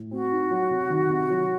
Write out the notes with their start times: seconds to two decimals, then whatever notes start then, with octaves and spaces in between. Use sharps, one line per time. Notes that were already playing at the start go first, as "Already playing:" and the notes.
Already playing: A2
0.11 C4 F#4
0.31 D#4
0.51 F#3
0.70 C3
0.90 D#3
1.09 C3
1.30 F#3